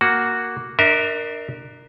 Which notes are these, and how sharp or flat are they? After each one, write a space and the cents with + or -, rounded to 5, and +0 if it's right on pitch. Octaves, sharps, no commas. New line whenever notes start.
A#3 +0 F#4 +0
D4 +25 A#4 +0 E5 -35